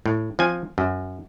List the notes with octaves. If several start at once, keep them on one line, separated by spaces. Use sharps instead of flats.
A2
F3 C4 G#5
F#2